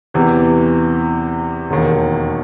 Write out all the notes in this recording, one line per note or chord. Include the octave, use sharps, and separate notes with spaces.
E2 C3 E3
E1 D#2 D#3